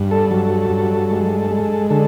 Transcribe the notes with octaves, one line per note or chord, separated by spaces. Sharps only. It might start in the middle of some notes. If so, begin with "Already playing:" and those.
Already playing: G2
A4
F#3
G2
G#3
G#3
D3 A4